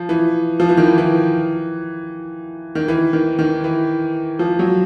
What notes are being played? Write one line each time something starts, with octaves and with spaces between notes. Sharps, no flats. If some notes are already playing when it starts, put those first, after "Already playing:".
Already playing: F3
E3
F3
E3
D#3
E3
E3
D#3
E3
D#3
D#3
E3
F3
F#3